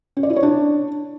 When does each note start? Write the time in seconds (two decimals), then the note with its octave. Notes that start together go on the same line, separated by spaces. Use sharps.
0.17 C#4
0.23 D5
0.30 E4
0.36 C#5
0.43 D4